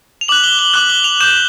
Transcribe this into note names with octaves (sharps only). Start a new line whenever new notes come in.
F7
D6 F#6 F#7
G7
G7
D6 F#6 F#7
G7
F7
D6 G6 E7